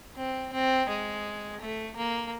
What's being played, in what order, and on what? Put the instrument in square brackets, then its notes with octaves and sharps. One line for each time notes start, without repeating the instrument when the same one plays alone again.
[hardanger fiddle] C4
C4
G#3
A3
A#3